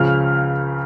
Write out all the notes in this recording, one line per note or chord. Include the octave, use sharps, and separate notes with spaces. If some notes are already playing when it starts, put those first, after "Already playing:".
Already playing: C#2 C#3 F3 F6